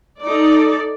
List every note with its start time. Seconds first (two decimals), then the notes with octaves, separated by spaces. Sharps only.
0.23 D#4 A4 D5